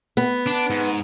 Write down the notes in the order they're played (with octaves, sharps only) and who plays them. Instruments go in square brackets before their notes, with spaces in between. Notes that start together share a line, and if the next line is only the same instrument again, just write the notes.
[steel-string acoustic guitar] B3
[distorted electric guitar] D4
G#2